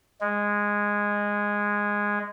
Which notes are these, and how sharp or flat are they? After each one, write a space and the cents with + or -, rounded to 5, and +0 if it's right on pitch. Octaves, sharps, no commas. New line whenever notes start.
G#3 -10